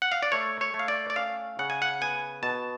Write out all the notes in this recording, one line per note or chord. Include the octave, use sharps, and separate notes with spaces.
F#5
F5
D5
A3 C#5
C#5
A3
F5
D5
D5
C#4 F5
C#3 F#5
G#5
F#5
B3 G#5
B2 A5